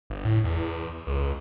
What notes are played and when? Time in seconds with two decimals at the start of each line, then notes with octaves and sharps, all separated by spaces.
0.10 G1
0.25 A2
0.44 E2
1.07 C#2